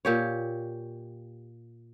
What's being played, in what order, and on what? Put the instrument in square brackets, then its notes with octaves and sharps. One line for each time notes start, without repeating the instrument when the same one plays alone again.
[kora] A#2 G4 C#5